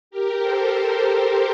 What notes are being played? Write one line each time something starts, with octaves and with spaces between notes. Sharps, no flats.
G4 A#4
A4 C5